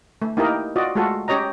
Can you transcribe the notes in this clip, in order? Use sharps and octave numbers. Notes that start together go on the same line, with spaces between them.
A3
A#3 D#4 E4 G4 A#4 D#5
F4 F#4 D5 D#5
G#3 A3 F4 F#4 A4
C#4 G4 C#5 D#5 A#5